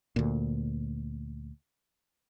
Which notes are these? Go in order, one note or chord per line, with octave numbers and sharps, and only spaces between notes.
D2 A#2